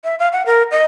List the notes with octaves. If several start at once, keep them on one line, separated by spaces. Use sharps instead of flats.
E5
F5
F#5
A#4
D#5